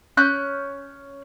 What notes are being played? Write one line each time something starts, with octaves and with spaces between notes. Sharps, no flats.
C#4 F#6 G6